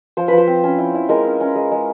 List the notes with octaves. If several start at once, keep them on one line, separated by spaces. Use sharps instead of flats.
F3 C5
F3 B4
C5
C4
C#4
E4
E4
G#3 A#4
C#4
C#4
G#3
G#3